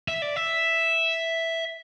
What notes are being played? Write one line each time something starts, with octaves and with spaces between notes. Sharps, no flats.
E5
D5
E5